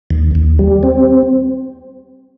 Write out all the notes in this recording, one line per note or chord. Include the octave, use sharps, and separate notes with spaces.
D#2
D#2
G3
C4